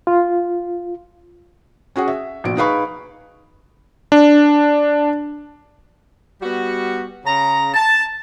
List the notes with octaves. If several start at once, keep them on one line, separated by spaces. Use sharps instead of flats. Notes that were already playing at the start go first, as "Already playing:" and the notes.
F4
C#4 F#4 G#4 F#5
E5
A#1 B2 D7
D#4 G#4 B4 F5 B5 C#6
D4
G3 B3 F#4
C#3 A#5
A5